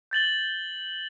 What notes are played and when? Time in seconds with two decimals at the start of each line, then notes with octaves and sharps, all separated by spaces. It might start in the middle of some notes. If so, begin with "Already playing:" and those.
0.11 G6 A6 F#7 G7